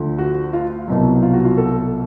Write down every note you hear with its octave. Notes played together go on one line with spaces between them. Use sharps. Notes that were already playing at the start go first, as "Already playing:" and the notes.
Already playing: D2 D3 F3
F#4
F4
C2 B2 F#3
F4
F#4
F4
A4